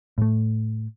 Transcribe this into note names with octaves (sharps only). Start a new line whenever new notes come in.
A2 A3